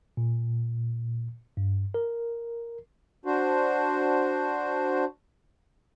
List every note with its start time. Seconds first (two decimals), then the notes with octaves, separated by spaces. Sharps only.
0.17 A#2
1.57 G2
1.94 A#4
3.26 D4 F#4 C5